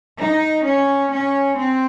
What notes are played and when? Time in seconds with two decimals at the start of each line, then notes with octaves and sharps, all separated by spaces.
0.19 D#4
0.64 C#4
1.11 C#4
1.56 C4